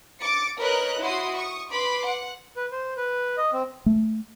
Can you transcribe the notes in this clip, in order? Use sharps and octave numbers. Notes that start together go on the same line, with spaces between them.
D6 A6 C#7
A#4 B4 C#5 D#5 F#6
E4 F#4 C6 D#6
C#6 D#6
B4 B5 C6 D6
F#5
B4
C5
B4
D#5
C4
A3